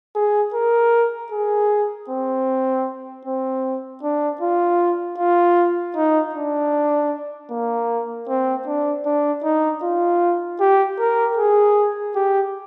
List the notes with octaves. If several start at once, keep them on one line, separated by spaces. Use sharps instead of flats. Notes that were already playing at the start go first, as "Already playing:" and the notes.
G#4
A#4
G#4
C4
C4
D4
F4
F4
D#4
D4
A#3
C4
D4
D4
D#4
F4
G4
A#4
G#4
G4